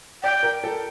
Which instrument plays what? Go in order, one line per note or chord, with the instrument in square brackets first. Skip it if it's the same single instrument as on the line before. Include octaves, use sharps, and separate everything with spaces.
[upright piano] D5 [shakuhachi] G5
[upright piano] A#4
A4